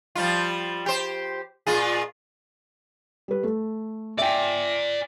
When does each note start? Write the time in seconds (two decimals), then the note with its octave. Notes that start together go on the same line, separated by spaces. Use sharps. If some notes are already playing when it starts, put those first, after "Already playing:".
0.15 F3 G3 F4
0.86 G4 C5
1.67 A#2 F4 G#4
3.28 G3 B4
3.43 A3
4.18 D5 E5 G5 G#5